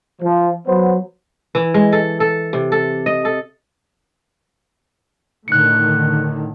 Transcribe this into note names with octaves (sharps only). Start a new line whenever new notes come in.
F3
F#3 B3 C5
E3
G#3
A4
A4
C3
A4
D#5
A4
A2 D3 D#3 F#6 C#7